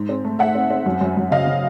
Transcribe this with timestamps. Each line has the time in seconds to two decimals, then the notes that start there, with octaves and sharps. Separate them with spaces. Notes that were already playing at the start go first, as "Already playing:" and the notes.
Already playing: G#2
0.09 C4
0.25 A3
0.39 A3 E5 F#5
0.55 C4
0.70 C4
0.86 F#2
1.01 F#2
1.17 F#2
1.31 C#3 D#5 F5
1.47 C#3